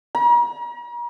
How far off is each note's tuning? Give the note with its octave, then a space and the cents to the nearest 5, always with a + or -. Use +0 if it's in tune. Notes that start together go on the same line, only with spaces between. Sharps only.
A#5 +40